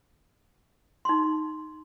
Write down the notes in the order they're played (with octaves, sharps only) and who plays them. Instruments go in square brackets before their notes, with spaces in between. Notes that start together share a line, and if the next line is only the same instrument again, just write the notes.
[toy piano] D#4 C6